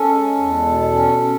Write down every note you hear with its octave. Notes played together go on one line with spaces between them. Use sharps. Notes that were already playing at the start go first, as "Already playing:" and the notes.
Already playing: C#4 A4
G#3
E2
B2
C#4
C#4